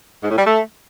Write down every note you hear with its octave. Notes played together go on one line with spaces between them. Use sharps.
G#2
A2
G3
A3